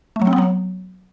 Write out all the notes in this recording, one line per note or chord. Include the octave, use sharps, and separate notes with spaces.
A3
F#3
C4
B3
F#3